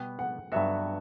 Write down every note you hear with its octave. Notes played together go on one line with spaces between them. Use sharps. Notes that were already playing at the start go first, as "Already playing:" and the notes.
Already playing: B2 G3 B3 G5
F#5
G2 F#3 B3 F#4 E5